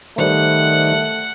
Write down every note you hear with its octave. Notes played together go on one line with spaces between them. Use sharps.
D#3 G3 A3 A#4 C5 F#5